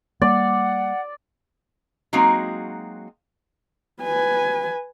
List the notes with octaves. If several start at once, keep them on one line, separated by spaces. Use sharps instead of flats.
G3 A#3 D5 F#5
F#3 G#3 A#3 C4 D#4 F#4
B4 G#5